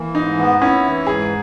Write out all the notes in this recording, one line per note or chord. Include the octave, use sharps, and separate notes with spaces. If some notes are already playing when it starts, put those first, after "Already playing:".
Already playing: E3 A#3
G#2 D#4
B3
C#4 E4
E3
G#2 G#4